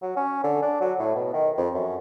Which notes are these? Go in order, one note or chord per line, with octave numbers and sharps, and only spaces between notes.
F#3
C#4
D3
D4
F#3
A2
B2
D#3
F2
F#2